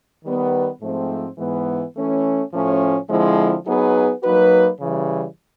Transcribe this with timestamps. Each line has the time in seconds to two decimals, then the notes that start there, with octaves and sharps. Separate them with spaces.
0.25 D#3 G3 B3
0.82 G#2 F3 A3 C4
1.38 G#2 E3 G#3 B3
1.95 E3 A3 C#4
2.53 A2 F3 A3 C#4
3.10 D3 F3 G#3 C4 E4
3.66 F#3 B3 D#4 G#4 B4
4.23 F#3 A#3 D#4 F#4 B4
4.80 C#3 E3 G3